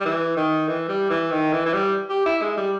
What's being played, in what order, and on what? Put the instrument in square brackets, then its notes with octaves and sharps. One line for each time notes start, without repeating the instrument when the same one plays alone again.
[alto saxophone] G3
E3
D#3
E3
G3
E3
D#3
E3
E3
G3
G4
E4
G#3
G3